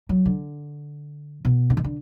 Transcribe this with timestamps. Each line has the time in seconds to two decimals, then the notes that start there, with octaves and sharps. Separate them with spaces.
0.09 F#3
0.26 D3
1.45 B2
1.70 D3
1.77 D#3
1.84 D3